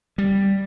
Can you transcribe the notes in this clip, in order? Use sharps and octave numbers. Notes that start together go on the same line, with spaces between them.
G3